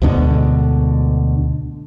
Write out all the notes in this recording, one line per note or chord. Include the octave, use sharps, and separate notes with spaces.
D2 G#2 B2 D3